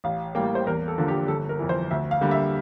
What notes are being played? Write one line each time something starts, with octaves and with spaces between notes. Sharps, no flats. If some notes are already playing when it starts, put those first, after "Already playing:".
A1 F5
A2 G3 A#3 G5
C5
E2 A#4
A4
D3 F3 A#3
G4
G1 A4
A#4
F2 E3
C5
D2 E5
F5
D3 G3 A#3
E5